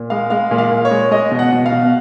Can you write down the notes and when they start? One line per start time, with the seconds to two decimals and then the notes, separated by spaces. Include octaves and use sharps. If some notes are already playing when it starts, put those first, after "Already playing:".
Already playing: A#2
0.10 G#3 F5
0.30 G#3 F5
0.51 A#2
0.58 F5
0.72 A#2
0.85 C#5
0.91 G#3
1.11 G#3 D#5
1.31 B2
1.39 F#5
1.52 B2
1.66 F5
1.72 B2